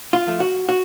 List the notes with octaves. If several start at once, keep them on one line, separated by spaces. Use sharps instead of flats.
F4
F3 A3
F#4
F#4